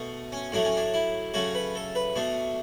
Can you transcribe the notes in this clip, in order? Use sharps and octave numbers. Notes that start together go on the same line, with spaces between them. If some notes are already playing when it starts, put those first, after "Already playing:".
Already playing: B2 A3
C#4
A2 F#3 A3 D4
C#4
D4
E4
C#3 F#3 A3 F#4
B4
A4
B4
B2 A3 D4